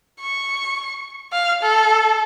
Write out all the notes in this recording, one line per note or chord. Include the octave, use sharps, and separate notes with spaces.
C#6
F5
A4